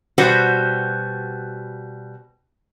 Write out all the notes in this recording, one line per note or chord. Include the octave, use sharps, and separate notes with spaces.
B2 G3 F#4 B4 C5 F#5